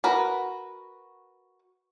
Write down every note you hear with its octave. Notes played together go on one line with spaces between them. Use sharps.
F#4 A#4 B4